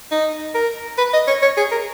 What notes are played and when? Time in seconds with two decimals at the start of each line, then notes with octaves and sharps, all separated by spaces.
0.11 D#4
0.55 A#4
0.98 B4
1.13 D#5
1.28 C#5
1.42 C#5
1.57 G#4
1.71 A#4